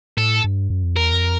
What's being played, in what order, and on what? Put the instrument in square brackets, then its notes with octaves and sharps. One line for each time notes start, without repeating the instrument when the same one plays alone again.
[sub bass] A2 [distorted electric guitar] A4
[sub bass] G2
F#2
F2
[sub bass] E2 [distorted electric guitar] A#4
[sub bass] F2